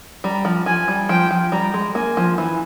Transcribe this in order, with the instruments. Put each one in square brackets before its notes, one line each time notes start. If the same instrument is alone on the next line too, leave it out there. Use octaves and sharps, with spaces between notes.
[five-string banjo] G3 [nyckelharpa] A#5
[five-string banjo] F3
[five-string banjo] F3 [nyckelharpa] G#5
[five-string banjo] G3
[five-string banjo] F3 [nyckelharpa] G5
[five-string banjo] F3
[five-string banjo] G3 [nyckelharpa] A#5
[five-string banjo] G#3
[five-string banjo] A#3 [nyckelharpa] G#5
[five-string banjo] F3
E3